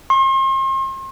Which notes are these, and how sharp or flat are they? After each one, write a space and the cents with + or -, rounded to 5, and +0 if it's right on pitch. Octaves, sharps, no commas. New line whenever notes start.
C6 +40